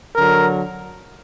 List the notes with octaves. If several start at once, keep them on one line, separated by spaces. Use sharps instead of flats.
D3 F#3 A#4